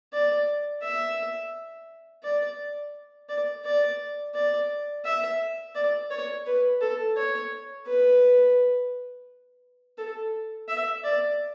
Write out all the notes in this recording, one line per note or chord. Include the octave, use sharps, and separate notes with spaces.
D5
E5
D5
D5
D5
D5
E5
D5
C#5
B4
A4
C#5
B4
A4
E5
D5